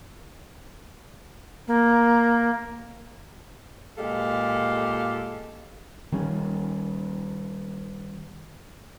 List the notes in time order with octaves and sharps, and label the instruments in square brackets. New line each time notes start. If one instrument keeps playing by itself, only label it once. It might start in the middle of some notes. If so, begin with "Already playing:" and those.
[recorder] A#3
[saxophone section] A#2 G#3 G4 A4 F5
[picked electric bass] D#3 G3 C#4